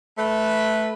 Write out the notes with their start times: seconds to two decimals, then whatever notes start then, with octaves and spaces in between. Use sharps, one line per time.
0.18 A3 B4